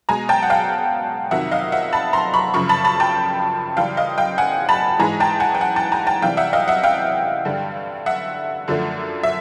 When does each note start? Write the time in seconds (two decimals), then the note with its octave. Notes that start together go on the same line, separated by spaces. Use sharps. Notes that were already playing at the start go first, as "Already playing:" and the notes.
0.09 B2 G#3 G#5 A#5
0.29 G5 A5
0.43 F#5
0.50 F5 G5
1.31 F2 C3 D#3 F#3 E5 F#5
1.51 D#5 F5
1.72 E5 F#5
1.93 A5 B5
2.13 A#5 C6
2.34 B5 C#6
2.54 F#2 C#3 F3 B5 C#6
2.69 A5 B5
2.85 A5 B5
3.00 G5 A5
3.77 F#2 C#3 E3 G3 F5 G5
3.97 D#5 F5
4.18 F5 G5
4.38 F#5 G#5
4.69 A5 B5
4.99 G#2 E3 G#3 G#5 A#5
5.20 G5 A5
5.40 F#5 G#5
5.55 G5
5.61 F#5 G#5
5.76 G5 A5
5.92 G#5 A#5
6.07 G5 A5
6.22 C3 E3 G3 F5 G5
6.37 E5 F#5
6.53 D#5 F5
6.68 E5 F#5
6.83 F5 G5
7.45 G2 D3 G3
8.06 E5 F#5
8.68 F#2 D3 F3 A3
9.23 E5